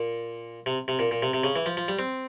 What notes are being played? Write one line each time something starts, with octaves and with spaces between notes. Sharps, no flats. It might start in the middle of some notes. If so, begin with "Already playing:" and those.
Already playing: A#2
C3
C3
A#2
A#2
C3
C3
C#3
E3
F3
F3
G3
C4